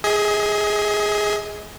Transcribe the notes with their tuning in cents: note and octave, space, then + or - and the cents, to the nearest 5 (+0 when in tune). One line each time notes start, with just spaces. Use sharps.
G#4 +0 D#5 +40